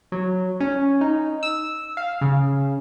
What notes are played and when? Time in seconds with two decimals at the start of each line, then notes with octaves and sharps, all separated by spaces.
0.12 F#3
0.61 C#4
1.01 D#4
1.43 E6
1.97 F5
2.21 C#3